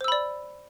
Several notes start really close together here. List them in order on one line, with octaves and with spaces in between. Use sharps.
C5 E6 B5 D5